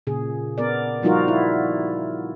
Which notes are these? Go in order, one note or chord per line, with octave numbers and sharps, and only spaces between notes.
A#2 C#3 G#4
B3 A#4 D5
F3 G3 D#4 F4 F#4 A#4
E4